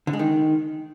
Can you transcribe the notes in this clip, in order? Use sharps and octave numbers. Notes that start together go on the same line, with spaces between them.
D3
G#3
D#3